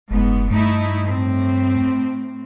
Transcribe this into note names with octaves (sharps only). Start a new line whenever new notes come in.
F#1 G#2 B3
G2 A3 D#4 E4
A2 C4